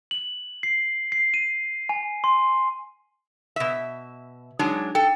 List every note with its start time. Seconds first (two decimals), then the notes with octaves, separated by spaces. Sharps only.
0.11 F#7
0.63 C7
1.12 C7
1.34 D#7
1.89 G#5
2.24 C6
3.56 B2 E5
4.59 F#3 G#3 D4 D#4
4.95 A4 G5